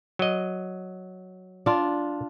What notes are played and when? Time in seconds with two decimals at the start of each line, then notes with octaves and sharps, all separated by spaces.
0.19 F#3 D#5
1.66 D4 F4